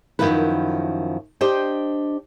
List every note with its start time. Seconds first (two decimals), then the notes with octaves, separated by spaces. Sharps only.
0.19 F#2 C3 D#3 F3 E4 B4
1.41 D4 G4 C5 D#5 G5